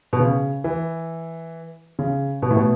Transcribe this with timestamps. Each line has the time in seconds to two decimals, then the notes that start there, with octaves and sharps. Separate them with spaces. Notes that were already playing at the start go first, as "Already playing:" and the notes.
0.13 B2
0.20 C#3
0.64 E3
1.99 C#3
2.42 B2
2.51 A2
2.56 B2